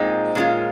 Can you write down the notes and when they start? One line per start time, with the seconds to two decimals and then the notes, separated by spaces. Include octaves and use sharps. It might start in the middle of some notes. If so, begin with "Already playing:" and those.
Already playing: A#2 G#3 C4 D#4 D#5
0.35 A#2 G#3 C#4 F4